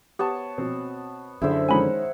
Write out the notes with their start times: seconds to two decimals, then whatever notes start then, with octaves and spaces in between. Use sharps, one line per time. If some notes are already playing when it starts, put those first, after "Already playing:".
0.19 B3 G4 C#5 A5
0.58 B2 C4
1.42 F#2 D3 E4 G#4 C5 E5
1.69 D#3 G#3 C#4 F#5 G#5 B5